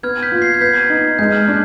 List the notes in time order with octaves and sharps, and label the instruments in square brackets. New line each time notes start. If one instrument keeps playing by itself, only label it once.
[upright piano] B3 [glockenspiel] F6 G#6
[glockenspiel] G6 B6
[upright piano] F4
[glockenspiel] G#6 C7
G#6
[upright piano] B3 [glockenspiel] G6 B6
[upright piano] D#4
[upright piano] G#3 [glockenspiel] G6
[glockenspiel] F6
[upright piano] D4 [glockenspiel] G6